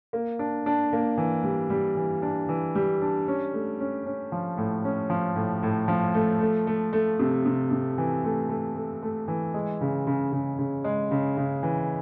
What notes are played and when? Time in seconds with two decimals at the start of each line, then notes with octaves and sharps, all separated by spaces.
0.13 A#3
0.39 D4
0.66 D4
0.93 A#3
1.18 E3
1.44 G3
1.70 G3
1.97 E3
2.22 D4
2.49 E3
2.75 G3
3.02 D4
3.28 C#4
3.53 A3
3.80 C#4
4.06 C#4
4.32 F3
4.58 A2
4.85 C#4
5.10 F3
5.36 A2
5.63 A2
5.88 F3
6.14 A3
6.41 A3
6.67 A3
6.93 A3
7.19 C3
7.46 C3
7.71 C3
7.98 E3
8.24 A3
8.49 A3
8.76 A3
9.03 A3
9.28 E3
9.54 G#3
9.81 C#3
10.07 C#3
10.32 C#3
10.59 C#3
10.84 G#3
11.11 C#3
11.37 C#3
11.63 E3